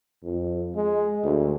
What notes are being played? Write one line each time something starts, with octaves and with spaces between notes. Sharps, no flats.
F2
G#3
D2